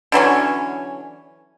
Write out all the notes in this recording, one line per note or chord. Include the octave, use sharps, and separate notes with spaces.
D3 E3 F#3 C#4